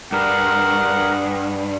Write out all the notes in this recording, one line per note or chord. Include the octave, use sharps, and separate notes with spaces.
G2 D4 G#4 A#4 F#5